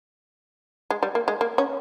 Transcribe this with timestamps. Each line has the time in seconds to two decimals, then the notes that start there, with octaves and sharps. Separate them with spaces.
0.90 G#3
1.03 G3
1.15 A#3
1.28 G#3
1.41 A#3
1.58 C#4